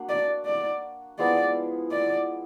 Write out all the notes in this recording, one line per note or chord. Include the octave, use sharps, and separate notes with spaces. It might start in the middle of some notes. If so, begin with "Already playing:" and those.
Already playing: A#3 D4 F#4
D5
D5
F3 G#3 B3 E4 D5
D5